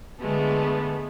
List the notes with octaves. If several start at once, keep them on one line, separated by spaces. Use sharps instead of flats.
D3 G#3 A3 B3